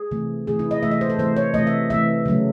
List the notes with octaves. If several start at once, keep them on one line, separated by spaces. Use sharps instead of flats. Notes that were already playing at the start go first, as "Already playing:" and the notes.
Already playing: G#4
C3 E3 A3
C3 E3 A3 G#4
E4
D#5
C3 E3 A3 E5
D#5
C5
A4
C3 E3 A3 C5
C#5
C3 E3 A3 D#5
E5
C3 E3 A3 E5
C#3 F#3 A3